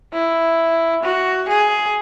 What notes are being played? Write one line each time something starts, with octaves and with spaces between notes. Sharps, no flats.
E4
F#4
G#4